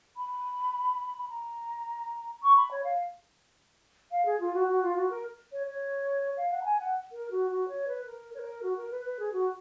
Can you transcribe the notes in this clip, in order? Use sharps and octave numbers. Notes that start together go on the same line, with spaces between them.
B5
B5
A#5
C#6
B5
C#5
F5
F5
G#4
F4
F#4
F#4
F4
F#4
A#4
C#5
C#5
F5
F#5
A#5
G#5
F#5
A#4
F#4
F#4
C#5
B4
A#4
C#5
A#4
F#4
A#4
B4
B4
G#4
F#4